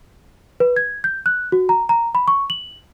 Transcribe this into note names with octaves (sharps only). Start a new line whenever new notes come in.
B4
G#6
G6
F#6
F#4
A#5
A#5
B5
C#6
F#7